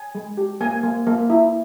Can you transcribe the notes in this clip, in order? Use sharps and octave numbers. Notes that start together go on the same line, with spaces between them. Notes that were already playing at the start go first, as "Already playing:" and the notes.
Already playing: G#5
G#3
G4
A#3 G#5
A#3
A#3
E4